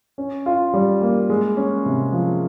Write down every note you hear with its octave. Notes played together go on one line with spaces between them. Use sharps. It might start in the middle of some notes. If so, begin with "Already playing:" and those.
C#4
F4
G3
A#3
G#3
C#4
C3
F3